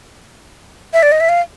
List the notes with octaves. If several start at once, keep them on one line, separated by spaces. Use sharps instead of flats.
E5
D5
D#5
E5
F5